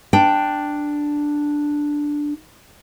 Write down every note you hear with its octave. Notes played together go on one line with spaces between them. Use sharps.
D4 G5